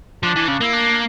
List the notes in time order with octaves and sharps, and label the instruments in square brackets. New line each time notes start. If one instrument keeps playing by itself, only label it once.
[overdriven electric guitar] F3 [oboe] D4
[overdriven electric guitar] E3
[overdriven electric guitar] C#3 [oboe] D4
[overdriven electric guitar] A#3 [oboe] E4
[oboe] D4